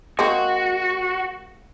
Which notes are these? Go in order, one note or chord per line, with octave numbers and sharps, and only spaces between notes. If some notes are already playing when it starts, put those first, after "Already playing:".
G#3 A#3 C4 F#4